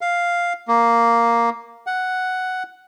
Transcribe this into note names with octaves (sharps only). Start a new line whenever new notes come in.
F5
A#3
F#5